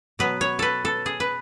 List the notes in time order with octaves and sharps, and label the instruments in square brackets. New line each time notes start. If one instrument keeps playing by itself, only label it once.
[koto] B2 F#3 B3 B4
C#5
A4 B4
A4
G#4
B4